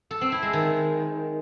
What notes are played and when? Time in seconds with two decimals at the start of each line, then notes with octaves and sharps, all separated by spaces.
0.11 A4
0.21 C4
0.32 E4
0.43 G#3
0.53 D#3